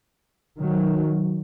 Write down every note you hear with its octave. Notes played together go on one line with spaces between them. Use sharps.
D#3 F#3